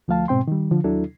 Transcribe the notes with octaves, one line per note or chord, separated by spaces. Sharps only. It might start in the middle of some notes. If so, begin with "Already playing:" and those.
D2 F3 A3 F5 A5
G#2 B2 C4 G5 C6
D#3 G3
D3 F3 F4
D#2 F#3 D4 E4 A4